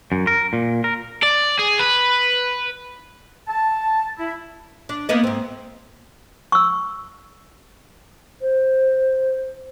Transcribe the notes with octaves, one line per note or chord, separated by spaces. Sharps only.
F#2
A#4
A#2
A#4
D5
G#4
B4
A5
E4
D4
A#3 B3 D#5
G#2 C4
C#6 E6
C5